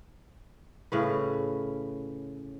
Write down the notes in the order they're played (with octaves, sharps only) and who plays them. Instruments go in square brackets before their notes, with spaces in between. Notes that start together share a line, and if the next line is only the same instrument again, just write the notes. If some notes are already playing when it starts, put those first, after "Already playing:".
[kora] A2 C#3 B4